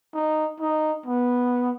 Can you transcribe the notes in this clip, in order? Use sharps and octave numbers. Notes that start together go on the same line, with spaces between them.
D#4
D#4
B3